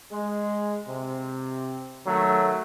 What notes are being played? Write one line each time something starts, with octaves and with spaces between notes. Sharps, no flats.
G#3
C3
D#3 F#3 A3